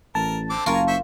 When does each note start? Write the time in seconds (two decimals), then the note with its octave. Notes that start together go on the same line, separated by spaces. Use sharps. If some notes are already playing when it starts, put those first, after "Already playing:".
0.15 A1 A#4 A5
0.50 D3 C4 D6
0.66 F#1 F4 A#4 G#5 A#5 C#6
0.88 C5 E5 C#6